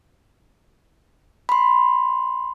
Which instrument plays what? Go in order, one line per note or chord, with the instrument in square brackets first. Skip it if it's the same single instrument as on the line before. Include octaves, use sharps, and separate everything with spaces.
[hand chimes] B5 C6